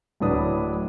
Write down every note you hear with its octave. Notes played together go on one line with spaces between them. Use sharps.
D1 A2 F#3 D4 B4 D#6